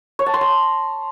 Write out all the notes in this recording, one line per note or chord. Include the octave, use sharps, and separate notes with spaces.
C#5
A5
C6
A#5